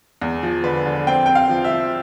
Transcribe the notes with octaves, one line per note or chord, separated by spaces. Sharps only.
E2
F3
D3 B4
D3
C4 G5
C4 G5
F5
F3
E5
F3